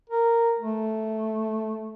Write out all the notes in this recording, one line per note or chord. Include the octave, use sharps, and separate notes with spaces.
A#4
A3